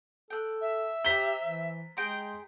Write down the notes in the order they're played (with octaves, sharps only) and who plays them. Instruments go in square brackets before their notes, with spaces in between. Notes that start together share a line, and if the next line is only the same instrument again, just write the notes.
[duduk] A4 [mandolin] G5 F#6
[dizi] E5
[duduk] G4 [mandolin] C5 A#5 [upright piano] B6 G7
[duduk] E3
[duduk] G#3 [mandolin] G#4 G5 A#5 [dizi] C6